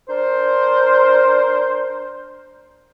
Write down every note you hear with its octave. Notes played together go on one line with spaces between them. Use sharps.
D4 A#4 C5